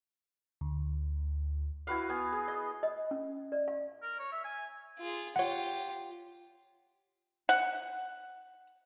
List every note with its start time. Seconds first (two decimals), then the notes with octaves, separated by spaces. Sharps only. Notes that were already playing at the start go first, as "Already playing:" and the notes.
0.61 D2
1.87 E4 F#4 B4 F5
2.09 B3 G#5
2.32 G#4
2.48 D#5
2.83 D#5
3.11 C#4
3.52 D5
3.68 F5
4.02 A#4
4.19 C#5
4.32 E5
4.45 G#5
4.99 F4 G#4
5.36 F4 G4 C#5 F#5
7.49 F#5